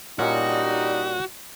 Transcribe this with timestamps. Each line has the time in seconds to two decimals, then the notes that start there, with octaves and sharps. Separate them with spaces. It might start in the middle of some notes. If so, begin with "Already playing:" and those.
0.19 G2 A#2 G3 C#4 D#4 F#4